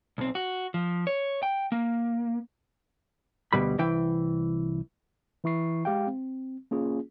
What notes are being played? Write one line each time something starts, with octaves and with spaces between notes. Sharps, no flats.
B1 C4
F#4
F3
C#5
G5
A#3
D2 B2 G3 B5
C2 E3 G5
E3 E4 C#6 C7
G#3 G4 F5 G5
C4
A#3 C#4 F4 G#4